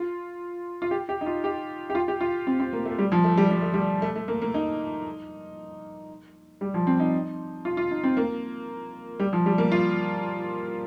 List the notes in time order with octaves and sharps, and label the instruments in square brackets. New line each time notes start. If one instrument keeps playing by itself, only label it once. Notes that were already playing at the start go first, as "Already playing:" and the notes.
Already playing: [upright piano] F4
F4
G4
G4
D#4
F4
G4
G4
F4
G4
F4
C4
C4
A#3
A3
G3
F3
A3
G3
G3
A3
G3
A3
A3
A#3
A#3
D#4
G3
F3
C4
D#4
F4
F4
D#4
C4
A#3
G3
F3
G3
A#3
F4